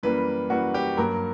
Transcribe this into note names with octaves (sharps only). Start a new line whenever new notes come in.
F#2 E3 G3 A#3 B4
F#2 E3 G3 A#3 F#4
G4
G2 F#3 A#3 A#4